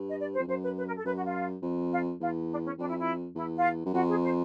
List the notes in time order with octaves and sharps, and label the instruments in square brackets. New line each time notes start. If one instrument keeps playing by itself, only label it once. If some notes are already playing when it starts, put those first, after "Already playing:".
Already playing: [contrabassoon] G2
[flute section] D#5
D5
C5
[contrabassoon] F2
[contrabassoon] F#2 [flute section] C5
[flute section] B4
B4
A#4
A4
[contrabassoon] F#2 [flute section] B4
[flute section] F#4
F4
[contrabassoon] F2
[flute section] F4
[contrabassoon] E2 [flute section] F4
[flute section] D4
C#4
[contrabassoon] F2 [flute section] D4
[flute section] E4
E4
[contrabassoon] E2 [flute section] E4
[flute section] F4
[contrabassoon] F#2
[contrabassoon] F2 [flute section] F#4
[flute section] G#4
C5